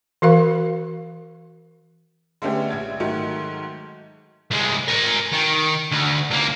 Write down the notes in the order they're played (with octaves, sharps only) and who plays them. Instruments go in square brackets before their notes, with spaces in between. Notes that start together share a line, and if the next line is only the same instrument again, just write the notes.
[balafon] E3 F#4 A#4 F5
[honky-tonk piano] D3 G#3 A3 B3 C#4 G4
A#1 E5 G#6
G#2 D#3 F#3 A3 C#7
[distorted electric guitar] C2 G#3
A#4 G#5
D#3
D2
C#2 A#3